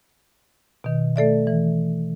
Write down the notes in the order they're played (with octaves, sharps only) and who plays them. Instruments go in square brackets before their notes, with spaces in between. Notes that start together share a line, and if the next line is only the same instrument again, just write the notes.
[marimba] B2 D#3
A3 A4 D5 E5
E3